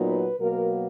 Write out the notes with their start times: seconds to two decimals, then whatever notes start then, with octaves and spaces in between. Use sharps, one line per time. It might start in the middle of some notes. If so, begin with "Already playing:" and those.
Already playing: A#2 F#3 B3 D#4
0.09 B4
0.40 B2 F#3 A#3 A#4